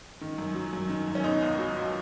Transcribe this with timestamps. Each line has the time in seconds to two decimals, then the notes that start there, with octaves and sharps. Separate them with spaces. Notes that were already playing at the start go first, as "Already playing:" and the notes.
0.21 D#3
0.38 F#2
0.55 F#3
0.73 F#2
0.89 D#3
1.07 F#2
1.15 C#4
1.24 B2 D#4
1.42 C#2
1.59 F#3
1.76 C#2